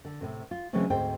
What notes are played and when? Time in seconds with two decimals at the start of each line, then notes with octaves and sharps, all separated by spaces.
0.05 D3
0.21 A2 C3
0.51 F4
0.73 C#3 E3 F#3 G#3 A3 C4
0.90 D2 G#2 C4 C5 G5